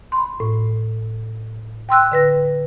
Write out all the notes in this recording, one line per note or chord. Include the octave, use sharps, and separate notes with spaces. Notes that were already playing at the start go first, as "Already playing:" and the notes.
B5 C6
A2
G5 C6 E6 F#6
D3 B4 A#6